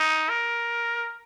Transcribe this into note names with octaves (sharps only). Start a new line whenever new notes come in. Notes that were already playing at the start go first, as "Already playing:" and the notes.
Already playing: D#4
A#4